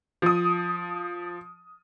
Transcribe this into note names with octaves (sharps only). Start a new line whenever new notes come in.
F3 D#6